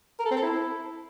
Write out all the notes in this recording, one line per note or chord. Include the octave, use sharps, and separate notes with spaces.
A#4
A4
C4
A4
E4